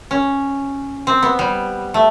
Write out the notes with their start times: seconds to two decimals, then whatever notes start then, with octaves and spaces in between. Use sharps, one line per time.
0.11 C#4
1.07 C4
1.23 B3
1.39 G3
1.94 A3